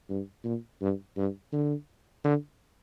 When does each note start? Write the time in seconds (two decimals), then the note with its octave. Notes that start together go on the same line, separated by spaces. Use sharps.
0.09 G2
0.44 A#2
0.82 G2
1.17 G2
1.52 D3
2.24 D3